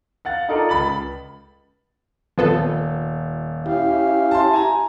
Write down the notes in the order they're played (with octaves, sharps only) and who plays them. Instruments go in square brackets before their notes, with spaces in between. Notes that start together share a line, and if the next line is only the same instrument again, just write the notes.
[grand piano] F5 F#5 A6
D#4 F4 A4 A#4 D5
C#2 B5 A6 F#7
[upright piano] D#1 [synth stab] F3 B3 A4
[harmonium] C#4 F5 [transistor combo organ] E4 G4
[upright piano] A5 C6
G#5 A#5